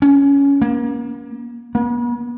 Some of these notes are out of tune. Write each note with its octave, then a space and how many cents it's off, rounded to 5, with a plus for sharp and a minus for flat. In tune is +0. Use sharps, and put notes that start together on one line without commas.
C#4 +15
A#3 +35
B3 -45